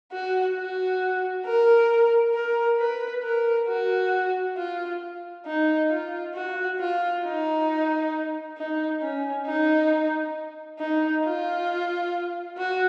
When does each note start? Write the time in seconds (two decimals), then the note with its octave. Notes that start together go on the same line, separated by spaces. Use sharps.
0.12 F#4
0.57 F#4
1.45 A#4
2.34 A#4
2.79 B4
3.23 A#4
3.68 F#4
4.57 F4
5.46 D#4
5.90 F4
6.34 F#4
6.80 F4
7.24 D#4
8.57 D#4
9.01 C#4
9.46 D#4
10.79 D#4
11.24 F4
12.58 F#4